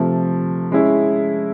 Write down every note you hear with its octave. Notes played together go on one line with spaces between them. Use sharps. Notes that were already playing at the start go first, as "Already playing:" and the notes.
Already playing: C3 F3 A3
G#3 C#4 E4